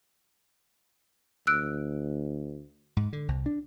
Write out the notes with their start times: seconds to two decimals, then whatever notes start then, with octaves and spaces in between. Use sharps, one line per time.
1.47 D2 E6 F#6 D7
2.97 G#2
3.13 D3
3.28 C2
3.46 D4